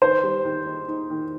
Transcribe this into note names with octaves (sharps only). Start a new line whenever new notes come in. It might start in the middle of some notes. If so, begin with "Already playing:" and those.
D#3 C5
G3
D#3
D#4
D#4
D#3